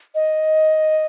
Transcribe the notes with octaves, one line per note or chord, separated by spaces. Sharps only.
D#5